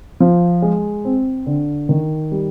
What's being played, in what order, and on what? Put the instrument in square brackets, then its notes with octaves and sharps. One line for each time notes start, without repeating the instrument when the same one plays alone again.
[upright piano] F3
G#3
C4
D3
D#3
G3